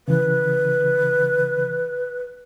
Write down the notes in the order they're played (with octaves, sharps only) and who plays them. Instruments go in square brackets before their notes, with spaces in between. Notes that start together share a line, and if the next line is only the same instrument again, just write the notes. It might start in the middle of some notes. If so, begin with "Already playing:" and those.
[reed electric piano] C#3 E3 [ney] B4